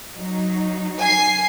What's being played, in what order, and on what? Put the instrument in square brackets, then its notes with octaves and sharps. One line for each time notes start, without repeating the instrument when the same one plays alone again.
[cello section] F#3 D#4
[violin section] G#5 C7